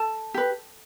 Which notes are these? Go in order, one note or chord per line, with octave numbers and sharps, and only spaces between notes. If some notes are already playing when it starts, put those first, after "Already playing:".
Already playing: A4 A5
G4 B4